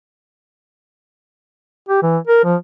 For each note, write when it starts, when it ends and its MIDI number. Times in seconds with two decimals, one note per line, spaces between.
1.89 2.01 67
2.03 2.18 52
2.27 2.44 70
2.44 2.56 53